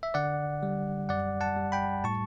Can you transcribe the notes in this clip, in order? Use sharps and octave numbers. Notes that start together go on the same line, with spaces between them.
E5
D3 D5 F#5
G3
F#2 D5 F#5
F#5 A5
G3
G5 B5
A2 A5 C#6